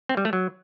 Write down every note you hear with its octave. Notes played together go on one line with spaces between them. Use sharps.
C4
G3
A3
F#3